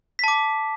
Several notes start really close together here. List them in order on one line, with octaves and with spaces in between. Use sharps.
B6 A5 D6